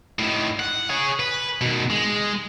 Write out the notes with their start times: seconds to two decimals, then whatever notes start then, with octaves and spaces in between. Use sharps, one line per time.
0.19 A2 D#3
0.59 F#5
0.90 G#4 C#5
1.19 B4
1.61 B2 D#3
1.90 G#3